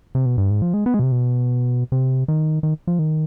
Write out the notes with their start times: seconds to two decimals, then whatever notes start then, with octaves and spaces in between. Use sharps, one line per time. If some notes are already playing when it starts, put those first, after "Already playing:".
0.15 C3
0.26 B2
0.38 G2
0.50 G#2
0.62 F3
0.74 G#3
0.86 B3
0.94 G#3
0.99 B2
1.03 C3
1.12 B2
1.92 C3
2.28 D#3
2.63 D#3
2.87 F3
2.99 D#3